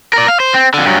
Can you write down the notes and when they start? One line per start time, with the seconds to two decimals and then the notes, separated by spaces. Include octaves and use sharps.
0.13 A#4 D5
0.28 F5
0.40 C5
0.54 C4
0.74 F2 D3
0.86 G2 F#3